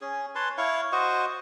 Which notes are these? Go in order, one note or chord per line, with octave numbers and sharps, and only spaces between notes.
C#4 G#4
B4 C#5 A5 C6
E4 C#5 F5 C#6
F#4 C5 D#5 C#6